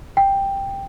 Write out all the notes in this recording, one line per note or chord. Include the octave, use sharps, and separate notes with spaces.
G5